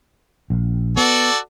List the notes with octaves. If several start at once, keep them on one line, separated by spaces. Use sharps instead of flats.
A#1
B3 F#4 A4 D5